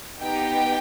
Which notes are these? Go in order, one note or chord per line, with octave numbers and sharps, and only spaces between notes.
B3 D#4 G4 G5